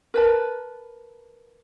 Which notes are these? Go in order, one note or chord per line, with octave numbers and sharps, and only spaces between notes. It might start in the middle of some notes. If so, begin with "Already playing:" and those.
A#4 B4 A5